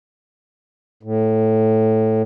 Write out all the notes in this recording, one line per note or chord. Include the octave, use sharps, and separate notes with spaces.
A2